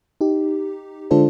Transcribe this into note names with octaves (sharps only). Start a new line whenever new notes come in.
D#4 G4
D3 G#3 D4 F4 A4 C5